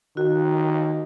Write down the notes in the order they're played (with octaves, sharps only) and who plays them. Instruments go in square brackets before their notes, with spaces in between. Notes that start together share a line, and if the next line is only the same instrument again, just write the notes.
[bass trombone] D#3 [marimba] F#4